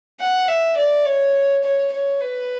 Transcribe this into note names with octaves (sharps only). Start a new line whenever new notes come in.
F#5
E5
D5
C#5
C#5
C#5
B4